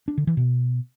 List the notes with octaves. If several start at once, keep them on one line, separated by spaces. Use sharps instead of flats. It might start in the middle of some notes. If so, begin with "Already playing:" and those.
D4
D3
E3
B2